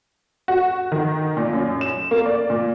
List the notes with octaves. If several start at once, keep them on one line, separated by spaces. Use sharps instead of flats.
F#4
D#3
A#2
F#2
E7
A#3
D5
A#2